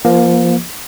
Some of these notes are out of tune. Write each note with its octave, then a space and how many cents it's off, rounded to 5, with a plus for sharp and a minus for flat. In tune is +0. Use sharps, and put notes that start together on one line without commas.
F3 -20 A#3 +20